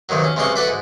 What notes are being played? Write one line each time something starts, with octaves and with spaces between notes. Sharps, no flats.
B1 F2 C3 D#3 F#3
C#4
B1 C3 G#3 C#4 C6 C#6
E4 F#4 A4 B4 D5 E5
G#2